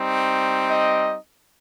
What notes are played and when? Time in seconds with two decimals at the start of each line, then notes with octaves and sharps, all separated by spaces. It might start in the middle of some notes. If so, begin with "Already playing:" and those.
Already playing: G3 C4 D#4
0.69 D#5